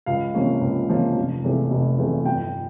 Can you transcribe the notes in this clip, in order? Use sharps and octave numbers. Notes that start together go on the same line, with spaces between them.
C#2 F5
C3 F3 A#3 C#4
C#2
C3 F3 A#3 C#4
F1
E2 C3 F3 A3
F1
E2 C3 F3 A3
G1 G5